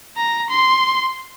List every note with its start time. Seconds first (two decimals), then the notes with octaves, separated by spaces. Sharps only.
0.17 A#5
0.50 C6